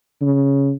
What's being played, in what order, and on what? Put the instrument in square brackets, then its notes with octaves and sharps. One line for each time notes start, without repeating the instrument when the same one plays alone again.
[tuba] C#3